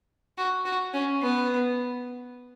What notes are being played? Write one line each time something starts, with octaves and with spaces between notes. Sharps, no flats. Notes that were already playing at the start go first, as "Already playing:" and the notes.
F#4
F#4
C#4
B3